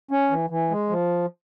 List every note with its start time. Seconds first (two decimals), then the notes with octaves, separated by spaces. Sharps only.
0.11 C#4
0.31 E3
0.50 E3
0.70 G#3
0.89 F3